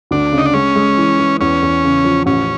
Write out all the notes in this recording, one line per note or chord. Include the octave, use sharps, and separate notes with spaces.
D2 D4
C#3
D#4
D4
G#3 C#4
G#3
E3
E3
E2 C#4
E2
C#3
F3
A1 C#4